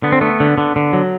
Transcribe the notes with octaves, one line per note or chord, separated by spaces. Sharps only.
D3 B3
C4
A3 B3
D3
D3
D3
F#3